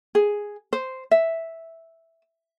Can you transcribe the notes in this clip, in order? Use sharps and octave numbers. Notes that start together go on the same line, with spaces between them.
G#4
C5
E5